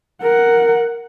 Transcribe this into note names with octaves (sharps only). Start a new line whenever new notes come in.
A#4 F#5